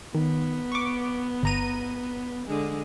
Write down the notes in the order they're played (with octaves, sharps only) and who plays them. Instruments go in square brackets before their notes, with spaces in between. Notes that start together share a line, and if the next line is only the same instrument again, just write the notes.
[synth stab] D#3 [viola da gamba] B3
[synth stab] C#6 D6
G1 A#5 D#7
[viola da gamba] D3 G#3